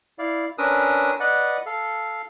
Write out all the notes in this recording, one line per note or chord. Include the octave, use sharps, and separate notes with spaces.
E4 D5 F5
C#4 D4 A#4 B4 D#6 E6
B4 D5 D#5 F#5
A4 F5